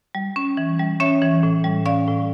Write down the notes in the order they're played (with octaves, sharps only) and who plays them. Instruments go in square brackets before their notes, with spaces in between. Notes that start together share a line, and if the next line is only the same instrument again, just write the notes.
[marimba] G3
C#4
E3
G3
C#4 C#5 E5
E3
A2
G3
C#4 D5 F5
A2